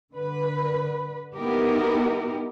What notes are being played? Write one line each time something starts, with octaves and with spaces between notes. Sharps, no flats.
D3 B4
B3 D#4 E4 G4 A#4